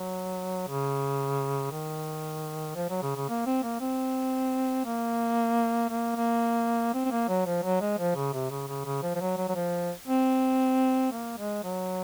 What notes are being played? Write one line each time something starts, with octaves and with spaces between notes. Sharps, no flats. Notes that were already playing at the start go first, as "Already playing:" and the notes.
Already playing: F#3
C#3
D#3
F3
F#3
C#3
C#3
A#3
C4
A#3
C4
A#3
A#3
A#3
C4
C4
A#3
F#3
F3
F#3
G#3
F3
C#3
C3
C#3
C#3
C#3
F3
F3
F#3
F#3
F#3
F3
C4
A#3
G#3
F#3